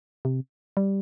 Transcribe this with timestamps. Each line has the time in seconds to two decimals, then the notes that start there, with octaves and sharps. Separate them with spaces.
0.25 C3
0.77 G3